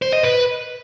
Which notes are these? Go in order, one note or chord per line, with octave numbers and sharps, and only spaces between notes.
C5
D#5
B4